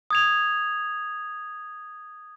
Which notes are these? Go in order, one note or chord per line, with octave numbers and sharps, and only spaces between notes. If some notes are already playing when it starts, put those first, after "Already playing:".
D#6 G#6 F7